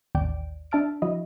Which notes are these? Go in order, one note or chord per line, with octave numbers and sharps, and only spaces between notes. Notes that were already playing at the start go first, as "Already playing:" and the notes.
A1 D#2 D5 G5 D7
D4 E5 A5 F6 D7
F3 E4 F#4 D#5